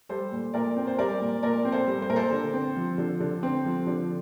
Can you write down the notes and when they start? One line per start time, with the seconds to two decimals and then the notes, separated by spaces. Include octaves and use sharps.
0.09 G3 A4 C5
0.32 A#2
0.54 A#2 A#4 D5
0.76 C4
0.87 C5
0.98 G3 A#4 D5
1.21 A#2
1.43 A#2 A#4 D5
1.65 C4
1.72 A4 C5
1.87 G3
2.02 C5
2.10 A#2 A#4
2.16 A4 C5
2.32 D3
2.54 C4
2.76 F3
2.98 D3
3.20 D3
3.43 C4
3.65 F3
3.87 D3